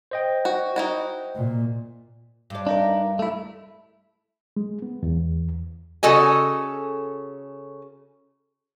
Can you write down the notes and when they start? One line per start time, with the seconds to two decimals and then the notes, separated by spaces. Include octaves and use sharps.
0.11 C5 D#5 G5
0.45 F#4
0.76 D#4 E4 F#4
1.36 A#2
2.50 G2 D5
2.67 D4 D#4 A#4
3.19 A3 E4
4.57 G#3
4.82 B3
5.03 E2
6.03 C#3 F#4 A4 D#5 G#5